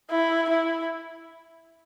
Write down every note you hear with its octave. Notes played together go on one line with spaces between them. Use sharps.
E4
E4